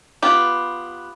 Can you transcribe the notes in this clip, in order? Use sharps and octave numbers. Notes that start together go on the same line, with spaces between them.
B3 F4 G4